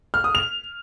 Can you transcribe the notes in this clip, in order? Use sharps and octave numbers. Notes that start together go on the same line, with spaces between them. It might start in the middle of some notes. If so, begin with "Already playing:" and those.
F6
D#6
F7